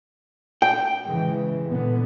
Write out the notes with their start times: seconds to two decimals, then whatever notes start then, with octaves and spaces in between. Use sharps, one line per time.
0.62 G5
1.06 C#3 E3 G#3
1.69 A#2 D3 B3